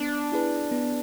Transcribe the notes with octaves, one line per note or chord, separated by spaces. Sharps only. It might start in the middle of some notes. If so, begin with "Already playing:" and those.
Already playing: B3 D4
E4 G#4 B4
B3